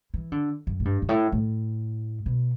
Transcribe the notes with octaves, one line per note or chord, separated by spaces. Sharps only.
E3
D3
F#2
A2
G2
G2
A2
A2
B2